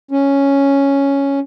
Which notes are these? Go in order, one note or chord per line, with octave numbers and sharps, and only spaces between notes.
C#4